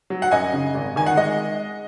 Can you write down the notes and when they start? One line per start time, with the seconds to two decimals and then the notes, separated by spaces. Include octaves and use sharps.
0.10 F#3
0.22 F#5
0.31 F#2 D#5 G#5
0.53 C#3
0.75 G#1
0.96 D#3 G#5
1.06 F#5
1.16 G#3 D#5